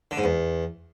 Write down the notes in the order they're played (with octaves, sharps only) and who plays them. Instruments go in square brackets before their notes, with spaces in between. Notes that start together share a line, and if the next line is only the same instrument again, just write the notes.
[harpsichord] D3
G#2
E2